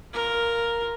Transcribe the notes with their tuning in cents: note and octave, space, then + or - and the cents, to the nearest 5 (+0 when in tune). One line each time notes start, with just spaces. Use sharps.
F4 +0 A#4 +0